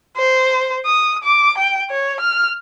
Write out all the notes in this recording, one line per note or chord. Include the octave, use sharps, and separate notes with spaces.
C5
D#6
D6
G5
C#5
F6